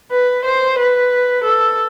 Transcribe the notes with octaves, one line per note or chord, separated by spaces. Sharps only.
B4
C5
B4
A4